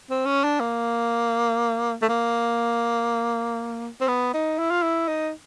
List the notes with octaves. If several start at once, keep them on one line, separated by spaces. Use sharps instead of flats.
C4
C#4
D4
A#3
A3
A#3
C4
B3
D#4
E4
F4
E4
D#4